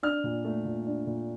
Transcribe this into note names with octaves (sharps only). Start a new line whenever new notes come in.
D4 F6
A#2
A3
A#2
D4
A#2